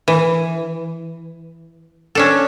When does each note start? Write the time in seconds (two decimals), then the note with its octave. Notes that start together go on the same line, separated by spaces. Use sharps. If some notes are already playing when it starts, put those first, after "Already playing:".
0.08 E3
2.15 C#4 D4 A4